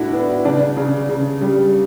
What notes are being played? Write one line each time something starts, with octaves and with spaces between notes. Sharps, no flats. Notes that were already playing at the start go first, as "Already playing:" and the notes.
Already playing: A2 D4 E4 F#4
B3
C#3 D4
C#3
C#3
G3